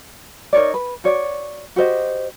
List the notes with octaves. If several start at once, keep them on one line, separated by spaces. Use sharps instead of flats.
D#4 A#4 C#5 D5
B4
F#4 C#5 D5
F#4 G4 C5 D#5